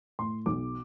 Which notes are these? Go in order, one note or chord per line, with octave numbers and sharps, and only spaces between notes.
A2 C6
B1 D6